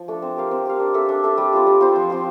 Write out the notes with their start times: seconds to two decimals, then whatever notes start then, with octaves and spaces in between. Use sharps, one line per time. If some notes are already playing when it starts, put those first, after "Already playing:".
Already playing: F3
0.08 A3 D4 A4
0.22 C4
0.37 G4 A#4 F5
0.51 C4
0.66 G4 A#4 F5
0.80 D4
0.94 A4 E5
1.09 D4
1.24 A4 E5
1.37 G3
1.53 C4 F4 C5
1.67 G3
1.80 C4 F4 C5
1.96 F3
2.10 C4 F4 C5